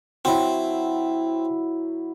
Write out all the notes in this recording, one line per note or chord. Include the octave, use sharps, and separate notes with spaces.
F#3 C4 E4